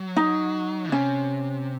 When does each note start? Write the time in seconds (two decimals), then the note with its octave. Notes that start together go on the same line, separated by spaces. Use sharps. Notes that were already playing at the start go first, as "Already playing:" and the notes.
Already playing: F#3
0.16 D#4
0.92 C3 C#4